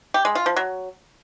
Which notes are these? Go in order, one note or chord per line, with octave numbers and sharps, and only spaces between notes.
G4
G#3
F4
F3
F#3